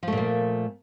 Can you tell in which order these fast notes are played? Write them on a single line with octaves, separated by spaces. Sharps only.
F3 A3 A#2 A#3